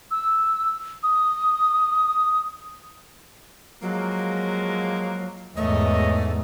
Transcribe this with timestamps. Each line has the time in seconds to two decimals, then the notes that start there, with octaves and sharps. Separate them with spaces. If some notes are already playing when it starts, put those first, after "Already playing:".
0.11 E6
1.03 D#6
3.82 F3 F#3 G#3 A#3
5.57 E2 G#2 A3 A#4 C#5 D#5